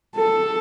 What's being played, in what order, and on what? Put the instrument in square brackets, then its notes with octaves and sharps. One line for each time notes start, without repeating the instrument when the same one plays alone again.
[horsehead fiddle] A4